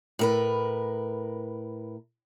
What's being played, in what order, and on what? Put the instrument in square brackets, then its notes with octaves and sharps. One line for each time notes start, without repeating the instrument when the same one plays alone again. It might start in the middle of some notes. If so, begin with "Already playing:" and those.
[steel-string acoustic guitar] A2 A#4 B4